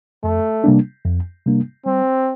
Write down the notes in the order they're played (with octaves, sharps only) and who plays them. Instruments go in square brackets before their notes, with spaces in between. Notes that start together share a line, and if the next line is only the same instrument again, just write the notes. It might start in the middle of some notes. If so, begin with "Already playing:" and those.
[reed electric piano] F2 [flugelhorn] A3
[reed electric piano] C3 G3 A#3 D4
F2
C3 G3 A#3 D4
[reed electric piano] G3 [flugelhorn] C4